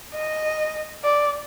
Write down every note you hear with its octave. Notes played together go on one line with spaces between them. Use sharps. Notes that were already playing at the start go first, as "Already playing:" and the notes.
D#5
D5